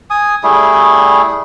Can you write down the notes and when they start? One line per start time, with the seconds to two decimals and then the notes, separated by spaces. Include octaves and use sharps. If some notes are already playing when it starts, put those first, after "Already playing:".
0.10 G#5 D#6
0.43 G3 A3 E4 G#4